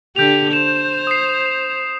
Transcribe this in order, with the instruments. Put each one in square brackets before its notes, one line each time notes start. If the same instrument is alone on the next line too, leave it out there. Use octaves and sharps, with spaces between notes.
[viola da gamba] D3 G4 [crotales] G6 F7
[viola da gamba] C5 [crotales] E7
[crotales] D#6 C7